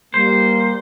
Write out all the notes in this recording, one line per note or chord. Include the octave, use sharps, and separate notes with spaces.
G3 A#3 C5